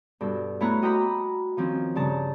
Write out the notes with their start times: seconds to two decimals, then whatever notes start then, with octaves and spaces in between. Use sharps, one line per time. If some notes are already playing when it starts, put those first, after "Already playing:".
0.21 G2 B2 A4
0.60 A3 B3 E4 C#5 A#5 F#6
0.82 F#4 D#5 G5 A#5 B5 D6
1.57 D#3 F3 C4 C#4
1.95 G2 C#3 A5 A#5